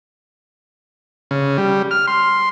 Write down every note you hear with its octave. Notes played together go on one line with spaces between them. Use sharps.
C#3
G3
F6
C6